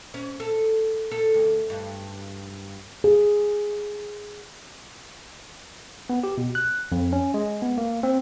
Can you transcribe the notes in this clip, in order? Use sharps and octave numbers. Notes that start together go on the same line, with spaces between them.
C#4
A4
A4
D2
G2
G#4
B3
G4
B2
F#6
F2
C#4
G#3
B3
A#3
C4